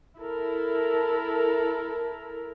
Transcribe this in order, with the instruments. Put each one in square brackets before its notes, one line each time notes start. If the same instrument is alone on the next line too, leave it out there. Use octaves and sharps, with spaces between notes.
[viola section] E4 A4 A#4